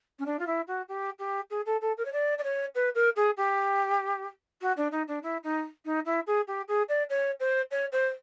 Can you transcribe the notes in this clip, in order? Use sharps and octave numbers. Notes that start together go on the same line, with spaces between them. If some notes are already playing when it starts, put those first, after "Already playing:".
C#4
D4
F4
E4
F#4
G4
G4
G#4
A4
A4
A#4
C#5
D5
D5
C#5
B4
A#4
G#4
G4
F#4
D4
D#4
D4
E4
D#4
D#4
E4
G#4
G4
G#4
D5
C#5
C5
C#5
C5